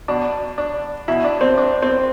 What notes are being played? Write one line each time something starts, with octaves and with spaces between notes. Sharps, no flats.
B2 D4
D4
B2 E4
D4
C4
D4
C4